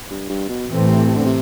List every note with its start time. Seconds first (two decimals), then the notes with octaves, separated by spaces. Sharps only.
0.11 G2
0.29 G2
0.49 B2
0.68 A2 E3 A3 C4
0.88 C3
1.07 C3
1.16 D3
1.26 C3